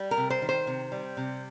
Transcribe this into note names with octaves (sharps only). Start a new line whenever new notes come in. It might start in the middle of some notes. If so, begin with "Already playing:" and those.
Already playing: G3
A#4
C3
C5
D#3
C5
C3
G3
C3